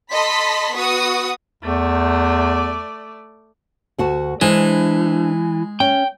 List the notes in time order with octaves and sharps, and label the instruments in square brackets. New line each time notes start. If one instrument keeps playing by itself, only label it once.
[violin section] A4 D#5 A5 B5 C6 B6
B3 F#4 B4 C#6 D#6
[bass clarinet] E2 [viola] A3 D5
[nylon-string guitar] D2 F#4 A5
[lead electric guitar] E3 [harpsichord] G#3 [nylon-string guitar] D4 C5
[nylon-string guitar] C#4 [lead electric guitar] G5